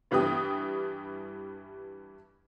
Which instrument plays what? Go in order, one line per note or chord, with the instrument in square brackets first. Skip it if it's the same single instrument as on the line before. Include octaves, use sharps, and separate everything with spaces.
[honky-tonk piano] G2 E3 G3 G5 D#6